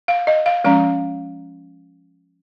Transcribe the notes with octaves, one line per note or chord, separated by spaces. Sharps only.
F5
D#5
F5
F3 G#3 C#4 F5